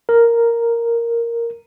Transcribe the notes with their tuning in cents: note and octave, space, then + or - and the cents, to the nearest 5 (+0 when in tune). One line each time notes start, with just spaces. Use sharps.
A#4 +0